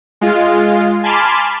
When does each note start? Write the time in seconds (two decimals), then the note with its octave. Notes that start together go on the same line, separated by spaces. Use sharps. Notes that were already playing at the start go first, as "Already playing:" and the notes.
0.21 G#3 F4
1.03 G#5 A5 B5 C6 D6 F6